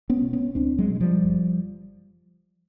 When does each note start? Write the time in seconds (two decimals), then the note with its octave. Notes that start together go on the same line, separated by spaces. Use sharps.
0.10 B3 C#4
0.22 B2
0.33 B3 C#4
0.55 C#2 C4 D4
0.78 F#3 G#3
0.90 B2
0.95 G#3
1.00 F3 G3
1.23 F#1